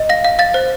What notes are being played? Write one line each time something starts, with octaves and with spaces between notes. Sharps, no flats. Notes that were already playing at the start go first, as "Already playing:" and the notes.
Already playing: D#5
F5 A#6
F5
F5 A6
C5